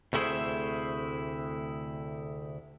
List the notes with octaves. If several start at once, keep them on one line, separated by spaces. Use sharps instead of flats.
D2 C3 A3 E4 G#4 C5